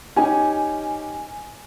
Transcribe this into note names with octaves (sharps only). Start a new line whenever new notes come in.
C#4 D#4 G4 G#5